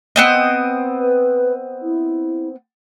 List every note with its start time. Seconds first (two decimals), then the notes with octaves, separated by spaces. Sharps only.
0.16 B3 C4 D#5
0.99 B4
1.82 E4